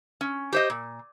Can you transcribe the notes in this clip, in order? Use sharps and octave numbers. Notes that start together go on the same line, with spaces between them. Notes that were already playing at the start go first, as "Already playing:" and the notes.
C#4
G4 C5 D#5
A#2